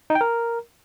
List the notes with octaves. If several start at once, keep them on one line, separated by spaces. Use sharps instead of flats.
D#4
G5
A#4